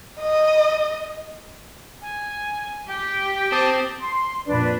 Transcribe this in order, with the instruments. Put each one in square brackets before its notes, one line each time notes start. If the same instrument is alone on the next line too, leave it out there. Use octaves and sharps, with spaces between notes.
[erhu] D#5
[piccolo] G#5
[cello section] G4 [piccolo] G5
[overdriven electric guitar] C4 [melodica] A5 D6 D#6
[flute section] C6
[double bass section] F2 A#2 [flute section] D4 B4 D5